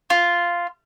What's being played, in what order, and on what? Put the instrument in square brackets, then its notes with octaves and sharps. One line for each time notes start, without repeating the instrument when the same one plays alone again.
[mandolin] F4